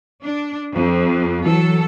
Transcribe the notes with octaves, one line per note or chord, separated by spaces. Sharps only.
D4
F2
E3 F#3 A4